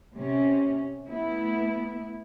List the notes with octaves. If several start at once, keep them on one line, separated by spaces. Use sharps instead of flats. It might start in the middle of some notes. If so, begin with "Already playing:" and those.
C3 C#4
A3 B3 E4